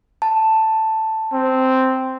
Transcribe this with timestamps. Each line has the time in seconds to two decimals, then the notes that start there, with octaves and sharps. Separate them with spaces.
0.22 A5
1.33 C4